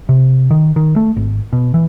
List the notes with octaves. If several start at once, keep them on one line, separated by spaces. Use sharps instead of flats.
C3
D#3
D#3
A3
G#1
B2
E3